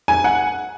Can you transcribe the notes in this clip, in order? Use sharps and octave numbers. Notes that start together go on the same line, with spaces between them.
G#5
F#5